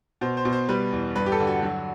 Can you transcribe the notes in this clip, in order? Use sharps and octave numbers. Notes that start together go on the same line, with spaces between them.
B2 C5
C5
B2
C5
G3 B4
E2
G2 B4
G4
A4
D3
F#4
F#3